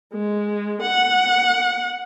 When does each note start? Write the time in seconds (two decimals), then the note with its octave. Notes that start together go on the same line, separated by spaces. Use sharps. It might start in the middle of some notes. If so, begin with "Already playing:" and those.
0.13 G#3
0.82 F#5